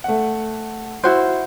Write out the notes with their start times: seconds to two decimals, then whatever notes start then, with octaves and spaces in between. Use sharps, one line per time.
0.04 A3 F#5
1.04 E4 F#4 C5